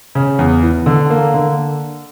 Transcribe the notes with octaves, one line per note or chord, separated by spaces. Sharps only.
C#3
E2
E3
D3
A#3
D3